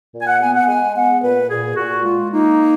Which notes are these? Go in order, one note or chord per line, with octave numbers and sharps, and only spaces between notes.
A#2
G#5
F#5
B3 G#5
F#5
G#3 G#5
B3 F#5
A#2 B4
A#2 G#4
A#2 F#4
G#3 F4
A#3 D#4